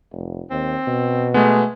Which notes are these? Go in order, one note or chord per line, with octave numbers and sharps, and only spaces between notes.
F1
D#2 C4
B2
G#3 A3 B3